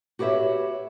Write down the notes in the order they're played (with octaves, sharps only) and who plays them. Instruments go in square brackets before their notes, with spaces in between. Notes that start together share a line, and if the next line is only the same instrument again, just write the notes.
[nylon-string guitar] F#4 G4 B4 C#5 E5